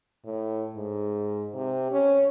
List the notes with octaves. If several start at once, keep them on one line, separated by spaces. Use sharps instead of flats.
A2
G#2
C3
C#4